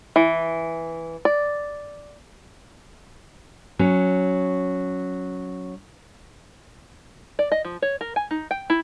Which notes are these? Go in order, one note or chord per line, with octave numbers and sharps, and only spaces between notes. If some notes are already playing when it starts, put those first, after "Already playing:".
E3
D5
F#3 C#4
D5
D#5
F3
C#5
A#4
G#5
D#4
G5
E4